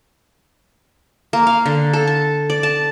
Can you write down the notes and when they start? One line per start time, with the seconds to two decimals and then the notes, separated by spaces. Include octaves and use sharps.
1.33 A#3
1.47 F5
1.66 D3
1.93 A4
2.07 A5
2.50 D5
2.63 A5